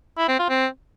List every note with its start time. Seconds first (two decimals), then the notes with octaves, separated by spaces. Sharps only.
0.18 E4
0.28 C4
0.39 F4
0.49 C4